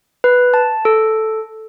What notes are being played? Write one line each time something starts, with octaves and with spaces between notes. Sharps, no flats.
B4
A5
A4